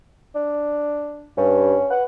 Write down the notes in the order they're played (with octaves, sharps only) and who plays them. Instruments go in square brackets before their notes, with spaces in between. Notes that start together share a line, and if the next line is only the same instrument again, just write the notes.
[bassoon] D4
[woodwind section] G2 [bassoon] C#4
[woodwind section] B4 F#5